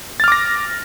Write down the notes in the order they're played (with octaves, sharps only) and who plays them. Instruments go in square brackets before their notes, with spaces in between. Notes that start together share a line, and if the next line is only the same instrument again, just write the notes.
[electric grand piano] A6
F6
D6
A#6